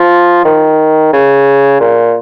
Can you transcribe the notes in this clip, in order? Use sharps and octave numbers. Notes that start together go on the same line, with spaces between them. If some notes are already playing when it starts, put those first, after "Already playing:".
Already playing: F3
D#3
C#3
A#2